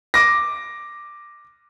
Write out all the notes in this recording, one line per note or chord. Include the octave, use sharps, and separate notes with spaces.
D6 A#6